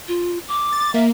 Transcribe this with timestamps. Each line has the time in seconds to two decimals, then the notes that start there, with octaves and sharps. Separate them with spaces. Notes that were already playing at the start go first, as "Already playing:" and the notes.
0.08 F4
0.49 D6
0.72 A6
0.94 A#3 E5